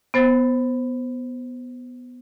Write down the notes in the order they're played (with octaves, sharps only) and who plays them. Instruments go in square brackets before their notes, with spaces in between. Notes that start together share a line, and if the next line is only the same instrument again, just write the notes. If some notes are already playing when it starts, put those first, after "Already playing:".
[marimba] B3 C5 A6